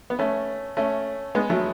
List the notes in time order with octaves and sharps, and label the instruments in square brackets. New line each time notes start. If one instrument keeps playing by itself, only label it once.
[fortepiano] B3
A3 C#4
A3 C#4
G#3 B3
F#3 A3